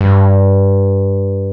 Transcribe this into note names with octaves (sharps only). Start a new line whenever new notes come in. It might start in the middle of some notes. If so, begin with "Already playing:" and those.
G2